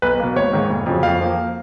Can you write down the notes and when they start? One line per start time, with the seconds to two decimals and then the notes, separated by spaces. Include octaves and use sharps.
0.02 B1 B4
0.19 B2 A#3
0.36 G#1 C#5
0.53 G#2 D#3 A#3
0.70 F1
0.86 F2 C#3 F#3
1.03 F2 F5
1.21 F3 A#3